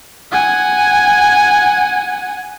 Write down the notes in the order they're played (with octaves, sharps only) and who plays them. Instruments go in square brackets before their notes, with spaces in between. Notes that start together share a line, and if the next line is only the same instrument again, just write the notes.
[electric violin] F#5 G#5